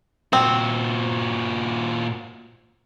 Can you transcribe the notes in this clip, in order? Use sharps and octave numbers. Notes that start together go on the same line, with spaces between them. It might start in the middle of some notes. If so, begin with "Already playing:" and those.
A#2 C4 F#4